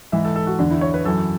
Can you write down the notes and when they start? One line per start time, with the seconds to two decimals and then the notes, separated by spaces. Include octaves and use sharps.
0.12 G#2 E3 E5
0.25 A4
0.36 A4
0.47 F#4
0.59 E2 D3 D4
0.71 E4
0.81 C#5
0.94 B4
1.05 F#2 E3 A4